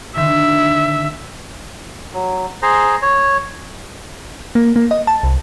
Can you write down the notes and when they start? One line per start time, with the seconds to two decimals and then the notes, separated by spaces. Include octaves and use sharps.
0.16 D3 D#3 E5
2.14 F#3
2.62 G#4 C5 A#5
3.02 C#5
4.55 A#3
4.76 A#3
4.91 D#5
5.07 A5
5.23 C2